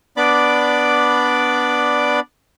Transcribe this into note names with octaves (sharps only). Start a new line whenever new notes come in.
B3 D4 D5 B5 D6